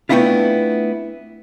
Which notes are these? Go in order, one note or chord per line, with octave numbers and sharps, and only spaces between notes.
A3 B3 C4 D4 E4 F4